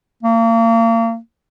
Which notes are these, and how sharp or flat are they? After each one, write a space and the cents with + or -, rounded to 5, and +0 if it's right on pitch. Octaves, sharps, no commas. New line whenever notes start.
A#3 -35